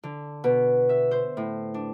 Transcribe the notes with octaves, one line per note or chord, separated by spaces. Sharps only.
D3
B2
E5
C5
A2
D4